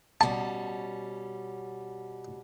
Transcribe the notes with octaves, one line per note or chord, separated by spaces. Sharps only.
B2 G3 C#4 A5